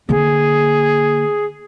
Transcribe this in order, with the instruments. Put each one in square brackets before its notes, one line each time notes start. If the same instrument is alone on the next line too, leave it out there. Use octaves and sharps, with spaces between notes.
[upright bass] D3 A#3 [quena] G#4